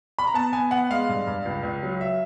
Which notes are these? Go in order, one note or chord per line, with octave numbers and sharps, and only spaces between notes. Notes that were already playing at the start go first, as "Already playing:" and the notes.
B5
A#5
B3 A5
B3 G#5
B3 F#5
G#3 F5
G2
G2
C#2
C#2
F#3
E5